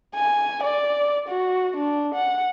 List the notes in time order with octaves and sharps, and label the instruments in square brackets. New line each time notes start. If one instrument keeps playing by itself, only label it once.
[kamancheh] G#5
D5
F#4
D4
F#5